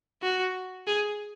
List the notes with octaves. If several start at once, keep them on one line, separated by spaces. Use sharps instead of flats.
F#4
G#4